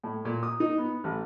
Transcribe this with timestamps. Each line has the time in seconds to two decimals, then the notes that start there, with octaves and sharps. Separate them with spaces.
0.04 A2
0.25 A#2
0.43 D#6
0.60 D#4
0.78 B3
1.04 A1